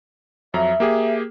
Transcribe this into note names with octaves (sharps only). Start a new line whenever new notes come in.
F2 F#3 E5 A#5
A#3 G4 G#4